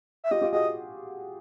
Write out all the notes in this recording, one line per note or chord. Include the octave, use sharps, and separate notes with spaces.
E5
F4 G4 D#5
F4 G4
F#4 G#4 D#5